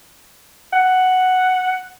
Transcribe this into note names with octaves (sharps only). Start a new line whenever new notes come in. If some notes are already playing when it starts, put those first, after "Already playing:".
F#5